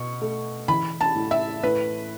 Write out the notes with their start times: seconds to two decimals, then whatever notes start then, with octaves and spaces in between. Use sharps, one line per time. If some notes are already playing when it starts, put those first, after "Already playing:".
Already playing: B2 C#6
0.22 A3
0.68 E3 B5
1.01 A5
1.15 A2
1.31 E5
1.63 A2 B4